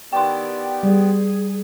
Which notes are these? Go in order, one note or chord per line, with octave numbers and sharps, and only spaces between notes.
D#3 B3 E4 G4 D5 G5 C6
G3 G#4